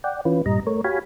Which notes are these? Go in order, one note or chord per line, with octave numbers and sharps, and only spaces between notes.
D5 F#5 G5
E3 C#4 F4 B4
G2 A#2 G3 D#5 A#5
A3 A#4 C#5
F#4 G4 C#5 F5 G#5 B5